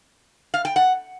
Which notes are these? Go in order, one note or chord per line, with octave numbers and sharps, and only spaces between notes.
F5
G5
F#5